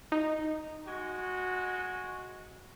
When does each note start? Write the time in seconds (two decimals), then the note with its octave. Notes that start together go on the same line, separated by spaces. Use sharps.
0.12 D#4
0.87 G#3 F#4